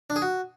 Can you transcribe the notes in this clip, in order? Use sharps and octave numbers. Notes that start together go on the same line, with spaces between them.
D4
G#4
F#4